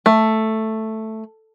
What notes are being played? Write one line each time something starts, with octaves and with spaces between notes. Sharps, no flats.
A3